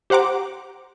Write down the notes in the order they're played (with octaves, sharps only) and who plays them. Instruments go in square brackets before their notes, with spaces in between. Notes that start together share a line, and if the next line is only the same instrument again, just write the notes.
[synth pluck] G4 C5 F#5 A#5 D6